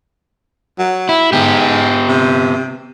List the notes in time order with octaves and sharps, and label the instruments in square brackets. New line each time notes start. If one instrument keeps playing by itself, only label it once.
[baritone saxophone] F#3
[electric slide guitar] E4
[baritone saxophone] G#2 [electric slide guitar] B3 G4
[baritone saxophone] C3